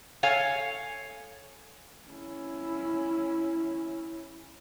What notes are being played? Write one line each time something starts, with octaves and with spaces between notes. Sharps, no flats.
A4 C#5 F5 G#5
C#4 E4